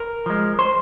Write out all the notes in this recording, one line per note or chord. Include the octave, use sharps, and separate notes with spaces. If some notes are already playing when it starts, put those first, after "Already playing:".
Already playing: A#4
F3 G#3
C5